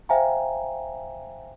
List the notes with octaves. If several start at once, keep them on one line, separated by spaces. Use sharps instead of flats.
C5 E5 F5 G5 G#5 A#5